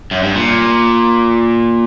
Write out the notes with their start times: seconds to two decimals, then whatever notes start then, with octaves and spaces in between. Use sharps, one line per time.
0.11 F#2
0.23 G2
0.35 A#2